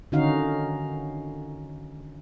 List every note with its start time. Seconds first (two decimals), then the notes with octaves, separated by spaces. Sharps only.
0.12 D3 D#3 C#4 D#4 F#4 F5